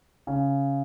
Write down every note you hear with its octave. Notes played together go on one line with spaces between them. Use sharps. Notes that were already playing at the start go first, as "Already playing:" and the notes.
C#3